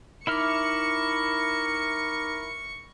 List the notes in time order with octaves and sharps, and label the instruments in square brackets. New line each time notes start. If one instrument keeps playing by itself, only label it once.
[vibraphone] D#4 D6 [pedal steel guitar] E4 E5 F6 [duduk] A#4 [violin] C#6 C#7